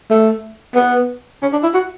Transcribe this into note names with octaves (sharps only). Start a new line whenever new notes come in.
A3
B3
C#4
D4
E4
F#4